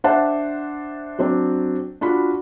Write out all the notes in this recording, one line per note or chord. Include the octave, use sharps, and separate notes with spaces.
D4 C5 E5 F#5 A5
F#3 C4 D4
D4 F4 F#4 B5